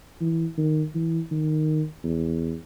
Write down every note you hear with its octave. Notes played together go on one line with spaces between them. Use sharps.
E3
D#3
E3
D#3
E2